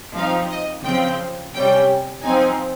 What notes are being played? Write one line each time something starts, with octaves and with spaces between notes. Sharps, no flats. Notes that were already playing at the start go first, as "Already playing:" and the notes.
F3 C4 D#4 F5
D#5
C#3 F3 C4 G5
C3 G3 C#4 G5
F3 C4 D#4 G#5